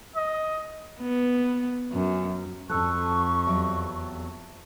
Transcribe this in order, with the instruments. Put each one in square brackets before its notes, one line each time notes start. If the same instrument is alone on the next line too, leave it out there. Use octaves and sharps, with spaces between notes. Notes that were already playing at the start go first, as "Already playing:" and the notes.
[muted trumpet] D#5
[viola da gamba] B3
F#2
[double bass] F2 [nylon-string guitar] A4 [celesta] A5 E6 F#6 [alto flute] C#6
[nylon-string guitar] E2 F#3 G4